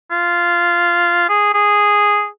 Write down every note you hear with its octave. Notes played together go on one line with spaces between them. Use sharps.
F4
G#4
G#4